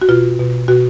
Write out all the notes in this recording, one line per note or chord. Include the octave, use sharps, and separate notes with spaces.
F#4
B2 F4
B2
B2 F#4